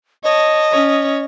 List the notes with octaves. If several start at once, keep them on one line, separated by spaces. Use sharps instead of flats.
C#5 D#5 A5
C#4 C#5